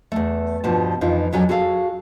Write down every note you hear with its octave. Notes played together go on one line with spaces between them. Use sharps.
E2 A3
G2 B2 F3 A5
F2 E3 D#4 F4
F2 G#2 F#3 C#4 A4 G#5
F#4 G#4 A4 F5